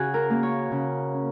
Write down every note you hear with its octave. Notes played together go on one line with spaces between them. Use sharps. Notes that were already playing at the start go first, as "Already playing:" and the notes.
Already playing: C#3 F#4 G#4
A#4
A#3 C#4
C#5
C#3
C#4